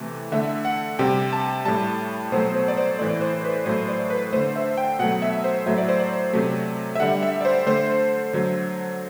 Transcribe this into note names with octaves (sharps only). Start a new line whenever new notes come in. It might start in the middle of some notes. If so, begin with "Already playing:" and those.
Already playing: C3 E3 A3
D3 A3 E5
F#5
C3 G3 G5
A5
A2 G3 A5
B2 F#3 A3 C5
C5
D5
C5
A2 E3 A3 D5
C5
B4
A2 F#3 A3 C5
D5
B4
D3 A3 C5
E5
G5
B2 F#3 A3 F#5
E5
C5
A2 F#3 A3 E5
D5
C5
D5
C3 F#3 A3
E5
D3 G3 F#5
E5
D5
C5
D3 A3 C5
D3 F#3 A3